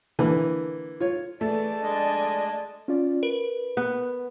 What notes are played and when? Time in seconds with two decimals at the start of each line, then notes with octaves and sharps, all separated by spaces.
0.19 D3 E3 A#3
1.00 F4 C#5
1.41 E3 A3 G#4 D5 A5
1.82 G#3 D4 D5 D#5 G#5
2.88 C#4 F4 D5
3.23 A#4 B4
3.77 B3